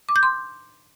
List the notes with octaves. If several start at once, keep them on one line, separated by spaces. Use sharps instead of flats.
D6
G6
C6